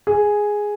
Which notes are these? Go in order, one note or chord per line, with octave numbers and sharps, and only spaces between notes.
G#4